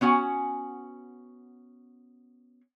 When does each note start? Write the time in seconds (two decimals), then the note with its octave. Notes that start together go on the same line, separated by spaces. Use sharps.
0.01 B3 C#4 F#4 F#5 G#5